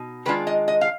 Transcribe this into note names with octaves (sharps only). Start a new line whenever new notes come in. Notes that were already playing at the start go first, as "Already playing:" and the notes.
Already playing: B2 D#4
D#3 G#3 D4 F4 B4
D#5
D#5
F5